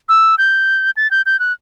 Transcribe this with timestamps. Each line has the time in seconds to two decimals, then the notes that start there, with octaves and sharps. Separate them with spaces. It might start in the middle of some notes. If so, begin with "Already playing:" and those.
0.09 E6
0.38 G6
0.97 A6
1.11 G6
1.26 G6
1.40 F#6